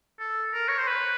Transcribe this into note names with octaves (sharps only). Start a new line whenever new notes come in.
A4
A#4
C#5
C5
B4